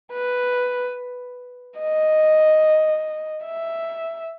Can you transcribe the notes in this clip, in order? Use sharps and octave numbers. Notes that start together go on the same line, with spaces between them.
B4
D#5
E5